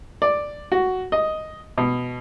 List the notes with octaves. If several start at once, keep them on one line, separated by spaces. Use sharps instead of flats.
D5
F#4
D#5
B2